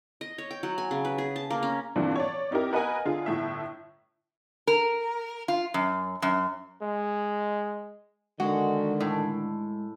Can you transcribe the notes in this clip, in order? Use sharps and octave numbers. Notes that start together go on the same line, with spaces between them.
D#5
C#5
G5
F#3
G#5
C#3
B4
G#4
A5
A#3
C#4
G2 A#2 D3 E3 C4 D4
C#5 D5
C4 D#4 E4 G4 A#4
A#4 B4 D#5 F#5 G#5 A#5
D3 F4 G#4
G1 A2 E4 E5
A#4
F4
F#2
F#2
G#3
D3 D#3 G#3 F#4 D#5
A2